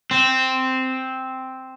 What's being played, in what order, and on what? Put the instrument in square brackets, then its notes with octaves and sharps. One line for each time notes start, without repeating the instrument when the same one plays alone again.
[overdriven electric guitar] C4